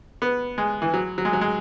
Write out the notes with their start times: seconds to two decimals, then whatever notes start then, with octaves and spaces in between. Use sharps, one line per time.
0.22 B3
0.58 G#3
0.82 E3
0.94 F#3
1.18 F#3
1.25 G#3
1.33 F#3
1.41 G#3